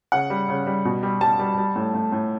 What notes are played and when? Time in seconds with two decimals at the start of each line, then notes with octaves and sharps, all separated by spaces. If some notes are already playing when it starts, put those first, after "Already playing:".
0.12 C#3 F#5
0.30 G3
0.49 C#3
0.67 G3
0.85 B2
1.03 G3
1.21 G3 A5
1.39 G3
1.58 G3
1.76 A2
1.94 A2
2.12 A2